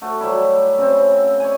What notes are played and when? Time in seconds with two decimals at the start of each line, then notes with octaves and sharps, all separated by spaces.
0.02 A3 F#4
0.20 F#3 G3 E4
0.78 C#3 C4
1.40 C#5 D5 G#5